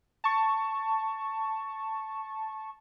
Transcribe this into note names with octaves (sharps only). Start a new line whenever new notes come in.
A5 C#6